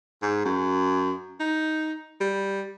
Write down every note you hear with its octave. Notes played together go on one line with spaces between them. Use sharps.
G#2
F#2
D#4
G3